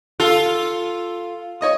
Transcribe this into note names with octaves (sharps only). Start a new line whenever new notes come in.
F4 A4
C#5 D#5 D#6